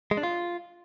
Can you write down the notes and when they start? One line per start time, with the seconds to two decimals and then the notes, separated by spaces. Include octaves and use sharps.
0.11 G#3
0.17 D4
0.23 F4